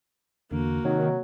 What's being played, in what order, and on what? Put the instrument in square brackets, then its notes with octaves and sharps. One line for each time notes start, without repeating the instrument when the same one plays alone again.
[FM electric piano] E2 D3 [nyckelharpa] A#3 F#4
[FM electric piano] C3 [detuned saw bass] D#3 [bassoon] F#3